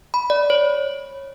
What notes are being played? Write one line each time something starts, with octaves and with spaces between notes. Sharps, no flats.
B5
D5
C#5